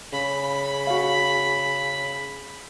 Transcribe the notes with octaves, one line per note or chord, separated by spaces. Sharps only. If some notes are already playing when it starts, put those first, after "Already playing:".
C#3 B5
F#4 F5